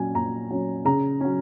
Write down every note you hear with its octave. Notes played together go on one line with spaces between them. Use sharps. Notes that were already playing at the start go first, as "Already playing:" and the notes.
Already playing: A#2 F#3 C#4 G#5
A#2 A#5
F#3 C#4
C#3 A#5
F#3 C#4